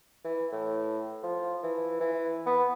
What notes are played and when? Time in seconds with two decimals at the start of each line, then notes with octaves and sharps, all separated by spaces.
0.25 E3
0.52 A2
1.23 F3
1.63 E3
2.00 E3
2.46 B3